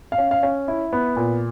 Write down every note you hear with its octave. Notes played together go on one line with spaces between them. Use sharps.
F5
C#4
F5
C#4
E4
B3
A#2